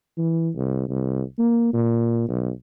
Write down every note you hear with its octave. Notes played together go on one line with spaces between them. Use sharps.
E3
C2
C2
A#3
A#2
B1